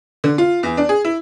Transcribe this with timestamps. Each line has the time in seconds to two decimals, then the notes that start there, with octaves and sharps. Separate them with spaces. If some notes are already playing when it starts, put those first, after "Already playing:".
0.24 D3
0.38 F4
0.63 E2
0.77 D4
0.89 G#4
1.05 E4